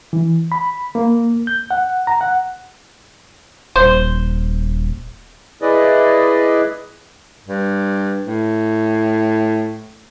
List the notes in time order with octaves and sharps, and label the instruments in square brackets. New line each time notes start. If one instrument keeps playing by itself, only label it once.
[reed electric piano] E3
B5
A#3
G6
F#5
A#5
F#5
[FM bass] D#1 [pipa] C5
[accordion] E4 G#4 B4 D5 D#5
[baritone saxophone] G2
A2